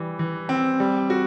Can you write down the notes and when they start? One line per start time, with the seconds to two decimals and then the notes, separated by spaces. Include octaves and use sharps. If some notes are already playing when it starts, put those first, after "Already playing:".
Already playing: E3 G3
0.19 E3
0.49 C4
0.80 G3
1.10 F#4